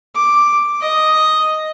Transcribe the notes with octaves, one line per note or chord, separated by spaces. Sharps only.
D6
D#5